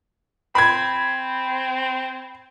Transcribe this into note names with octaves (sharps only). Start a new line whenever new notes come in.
C4 B5 G#6